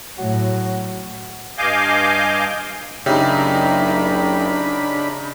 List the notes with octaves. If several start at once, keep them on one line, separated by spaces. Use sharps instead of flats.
A2 F#3 F#4
G2 D#5 F5 G#5 D6 G6
F#1 C#3 D4 D#4 G4 E5 G5 B5